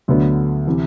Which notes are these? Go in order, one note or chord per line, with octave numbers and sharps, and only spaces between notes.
D2 D3 F#3 B3 D4
C3 E3